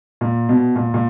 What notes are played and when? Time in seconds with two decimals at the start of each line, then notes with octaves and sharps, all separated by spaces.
0.21 A#2
0.49 B2
0.76 A#2
0.94 A#2